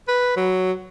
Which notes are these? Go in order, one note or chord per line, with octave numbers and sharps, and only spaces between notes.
B4
F#3